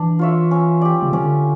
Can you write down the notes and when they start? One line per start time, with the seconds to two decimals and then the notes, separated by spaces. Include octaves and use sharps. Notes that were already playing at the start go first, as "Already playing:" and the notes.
Already playing: E3 D4
0.19 F4 C#5 E5
0.51 C#4
0.81 G4 D5
1.02 C#3
1.13 D3 C#4